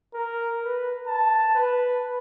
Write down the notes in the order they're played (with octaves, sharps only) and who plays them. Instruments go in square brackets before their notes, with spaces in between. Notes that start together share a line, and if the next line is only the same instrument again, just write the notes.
[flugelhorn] A#4
B4
A5
B4